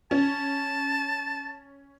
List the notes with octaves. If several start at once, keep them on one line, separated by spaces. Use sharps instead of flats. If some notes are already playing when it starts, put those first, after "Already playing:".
C#4 A5